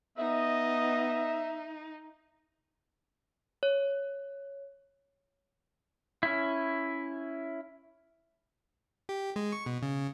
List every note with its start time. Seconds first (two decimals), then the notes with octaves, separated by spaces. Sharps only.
0.18 B3 D#4 D#5 E5
3.63 C#5
6.23 C#4 E4
9.09 G4
9.36 G#3
9.52 C#6
9.66 B2
9.82 C#3